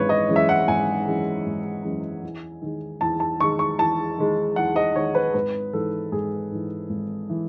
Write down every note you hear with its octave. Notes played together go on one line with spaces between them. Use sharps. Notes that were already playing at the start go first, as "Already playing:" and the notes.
Already playing: G#1 F#2 E3 G#3 B4 C#5
D#5
F#2 E3 G#3
E5
F#5
G#1 G#5
F#2 E3 G#3
G#1
F#2 E3 G#3
E2
D#3 G#3
E2 A5
A5
D#3 G#3 C#6
C#6
E2 A5
D#3 G#3
E2 F#5
D#5
D#3 G#3 C#5
B4
G#1 B4
G#2 E3 A4
G#1 G#4
G#2 E3
G#1
E3